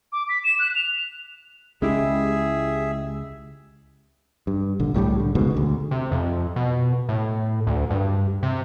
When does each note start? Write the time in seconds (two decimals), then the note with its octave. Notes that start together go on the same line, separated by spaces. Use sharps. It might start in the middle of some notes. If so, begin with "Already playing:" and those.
0.12 D6
0.29 B6
0.44 E7
0.59 F#6
0.75 F7
1.82 C#2 G#3 C#4 E4 G4 G#4 E5
4.47 G2
4.80 A#1 D3
4.94 C2 A2 F#3 G3
5.20 D3
5.35 F1 C#2 G#2 B2
5.54 D2 D3
5.91 C3
6.12 F2
6.56 B2
7.09 A2
7.67 D2
7.90 G2
8.43 C3